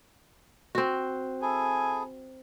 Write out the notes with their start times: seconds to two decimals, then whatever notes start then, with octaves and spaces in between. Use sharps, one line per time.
0.75 C4 F#4
1.42 E4 G#4 A4 G#5